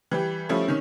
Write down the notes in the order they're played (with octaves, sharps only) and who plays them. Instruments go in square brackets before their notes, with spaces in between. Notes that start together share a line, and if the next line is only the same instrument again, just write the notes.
[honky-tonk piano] E3 G3 G4
F3 G3 A3 C#4 E4
C3 D#3 C#4